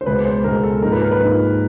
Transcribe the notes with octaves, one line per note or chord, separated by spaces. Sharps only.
C5
C#2 B2 G#3 B4
C5
C#2 B2 G#3 A#4
A4
G#2 F3 A#3 D#4 A#4
B4
A#4
B4
G#2 F3 A#3 D#4